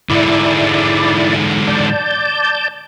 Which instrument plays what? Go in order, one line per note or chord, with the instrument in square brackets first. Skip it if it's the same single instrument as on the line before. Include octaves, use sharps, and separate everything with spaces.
[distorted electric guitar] G#2 D3 [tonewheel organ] E4 D5
[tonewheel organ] D5 A5 G6